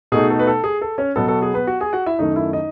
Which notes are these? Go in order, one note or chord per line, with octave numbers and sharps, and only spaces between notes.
B2 A3 D#4 G#4
A4
B4
A4
G#4
A4
C#4 C#5
B2 F#3 B3 A4
A4
G#4
B3 B4
F#4 F#5
G#4 G#5
F#4 F#5
E4 E5
F#2 D#3 A3 D#4 D#5
E4 E5
D#4 D#5